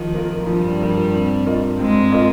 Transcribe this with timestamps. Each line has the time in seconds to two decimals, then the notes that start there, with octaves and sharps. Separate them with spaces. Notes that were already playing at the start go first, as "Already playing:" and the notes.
Already playing: D#3 F3
0.14 A#3 F4 A#4
0.47 G2 F3 G3
0.81 A#3 F4 A#4
1.13 C4
1.46 F4 A#4 D#5
1.79 G#2 G#3 C4
2.12 F4 A#4 D#5